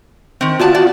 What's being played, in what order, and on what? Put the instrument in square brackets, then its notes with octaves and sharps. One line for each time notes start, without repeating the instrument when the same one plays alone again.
[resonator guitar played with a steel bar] D#3 C4
[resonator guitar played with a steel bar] B3 D5 A5 [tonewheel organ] F4 F#4
[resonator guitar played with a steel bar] B3 D5